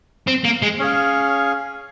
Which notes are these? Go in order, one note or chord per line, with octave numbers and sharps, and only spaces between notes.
C4
A#3
G#3
C#4 G#4 C#5 F5